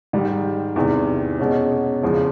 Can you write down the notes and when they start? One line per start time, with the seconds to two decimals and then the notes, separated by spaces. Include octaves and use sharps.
0.13 G#2 D#3 G3
0.76 E2 C3 D#3
1.40 B2 G#3 C#4
2.02 E2 C#3 F3 G#3